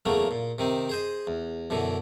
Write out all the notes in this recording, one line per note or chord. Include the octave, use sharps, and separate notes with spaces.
E2 C#3 F#3 A3 A#3
A#2
C3 D#3 C4
G#4 C5 D#5
E2
F#2 B2 D3 E3